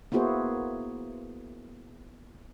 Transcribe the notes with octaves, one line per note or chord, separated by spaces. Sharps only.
A#3 B3 E4 F#4 G#4 C5